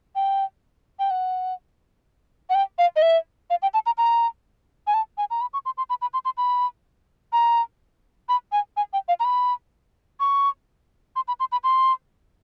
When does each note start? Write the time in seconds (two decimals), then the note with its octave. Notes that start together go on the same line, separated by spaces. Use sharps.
0.16 G5
0.99 G5
1.11 F#5
2.50 F#5
2.55 G5
2.79 F5
2.96 D#5
3.02 E5
3.50 F5
3.62 G5
3.74 A5
3.86 A#5
3.98 A#5
4.87 G#5
4.94 A5
5.18 G#5
5.31 A#5
5.41 B5
5.53 C#6
5.66 C6
5.78 C6
5.90 B5
6.02 B5
6.14 C6
6.25 C6
6.37 B5
7.33 A#5
8.29 B5
8.52 G#5
8.77 G#5
8.93 G5
9.08 F5
9.20 A#5
9.25 B5
10.20 C#6
11.16 C6
11.28 B5
11.40 C6
11.52 B5
11.64 C6